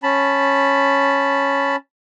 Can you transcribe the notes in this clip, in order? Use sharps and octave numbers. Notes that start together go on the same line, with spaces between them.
C#4 A5 B5